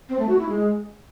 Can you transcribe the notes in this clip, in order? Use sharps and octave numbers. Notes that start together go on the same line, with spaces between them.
C4
A3
F#4
E4
G#3